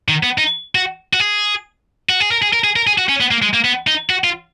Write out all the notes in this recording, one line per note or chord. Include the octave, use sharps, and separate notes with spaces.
D#3
B3
D#4
F#4
F#4
G#4
F#4
G#4
A#4
G#4
A#4
G#4
A#4
G#4
F#4
C#4
B3
A#3
G#3
A#3
B3
D#4
F#4
F4